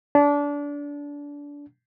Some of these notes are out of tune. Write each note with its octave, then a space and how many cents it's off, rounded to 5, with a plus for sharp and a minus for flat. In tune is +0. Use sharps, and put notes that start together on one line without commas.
D4 -25